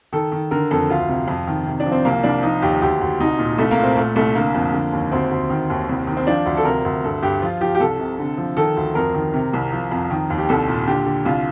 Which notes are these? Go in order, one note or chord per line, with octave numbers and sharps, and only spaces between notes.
D#3 A4
D#3
D3 A#4
F2 A4
D2 F4
C3
F2
D#3
C3
D4
F3
C4
C2 A#3
C2 D4
F3 D#4
D#2 G4
D2 G4
D2
C2 D#4
A#2
C2 A3
A#3
A#2
C4
A#2 A3
C2 A3
D3 A#3
F2
D3
D#2
D2 C4
D2
D#3
D#2
C2
D#3
C4
F3 D4
D2
A4
C3 A#4
D2
G2 A4
G2 G4
F3 F4
F3 G4
G4
C2 A4
C3
D3
F3
D#3 A4
D2
F2 A#4
D#3
C3
C2
F3
F2
D#3
D#2
G4
C2 A4
A#2
D3 G4
D3
C2 F4